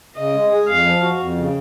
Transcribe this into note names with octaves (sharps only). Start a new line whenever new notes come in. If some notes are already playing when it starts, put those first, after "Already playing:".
C#3 D#5
G#3
G#4
F2 F5
F3
F#4
F2
C#3